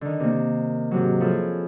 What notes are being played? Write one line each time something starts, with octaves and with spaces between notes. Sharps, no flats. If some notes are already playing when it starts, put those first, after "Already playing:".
D3 D#3
C3 A#3
G#2 C3 F#3
F3 E4 F4 G#4 A4 C#5